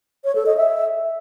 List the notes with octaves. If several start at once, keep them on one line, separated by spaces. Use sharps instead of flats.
C#5
A4
D#5
E5